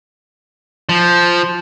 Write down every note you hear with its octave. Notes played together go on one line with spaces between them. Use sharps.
F3